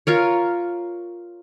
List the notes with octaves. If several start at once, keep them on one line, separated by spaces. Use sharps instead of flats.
F4 A#4 C#5